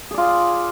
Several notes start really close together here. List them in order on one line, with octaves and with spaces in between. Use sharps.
G#4 D5 F4